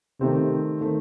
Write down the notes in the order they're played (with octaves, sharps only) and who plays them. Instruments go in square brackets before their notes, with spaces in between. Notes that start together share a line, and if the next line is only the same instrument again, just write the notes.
[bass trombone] C3 [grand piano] D#3 A3 C4
[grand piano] D#3 A3